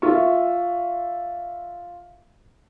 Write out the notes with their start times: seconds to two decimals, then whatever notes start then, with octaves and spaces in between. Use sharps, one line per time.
0.02 F4 E5 C#6